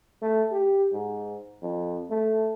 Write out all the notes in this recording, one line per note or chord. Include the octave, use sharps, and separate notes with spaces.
A3
G4
G#2
F2
A3